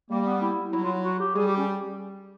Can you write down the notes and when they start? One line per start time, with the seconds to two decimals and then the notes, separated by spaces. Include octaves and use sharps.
0.10 G3 A#3
0.26 B3
0.41 E4
0.73 F#3 E4
0.84 F4
1.04 F#4
1.20 G4
1.36 G3 G#4
1.47 G4
1.57 C#4